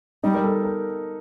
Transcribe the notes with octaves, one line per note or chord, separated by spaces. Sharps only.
G3 D#4
A#4
A4
A#4